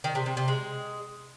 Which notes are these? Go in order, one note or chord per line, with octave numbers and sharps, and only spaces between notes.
D#3
C3
C3
C3
G#3